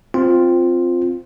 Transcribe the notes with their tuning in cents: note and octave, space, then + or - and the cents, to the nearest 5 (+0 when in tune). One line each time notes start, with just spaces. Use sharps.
C4 +0 F4 +0